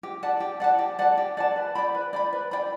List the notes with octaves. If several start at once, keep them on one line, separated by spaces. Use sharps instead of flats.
G4
D5 F#5 A5
G4
D5 F#5 A5
G4
D5 F#5 A5
G4
D5 F#5 A5
B4
D5 G5 B5
B4
D5 G5 B5
B4
D5 G5 B5